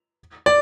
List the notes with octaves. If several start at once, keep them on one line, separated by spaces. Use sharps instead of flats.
D5